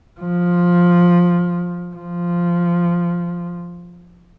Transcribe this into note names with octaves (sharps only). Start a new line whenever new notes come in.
F3
F3